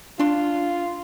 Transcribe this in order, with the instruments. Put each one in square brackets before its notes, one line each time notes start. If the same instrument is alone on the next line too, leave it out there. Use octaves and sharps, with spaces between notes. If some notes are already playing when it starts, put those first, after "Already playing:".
[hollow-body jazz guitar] D4 C6 [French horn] F4